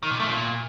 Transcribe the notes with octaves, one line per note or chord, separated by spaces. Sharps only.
D#3
A#2
A3
A#2